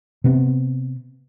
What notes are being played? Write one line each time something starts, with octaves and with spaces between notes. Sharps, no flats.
C3 B3 C4